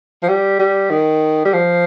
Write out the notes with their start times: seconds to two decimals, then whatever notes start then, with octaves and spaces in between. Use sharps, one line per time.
0.23 F3
0.28 G3
0.59 G3
0.90 D#3
1.45 G3
1.53 F3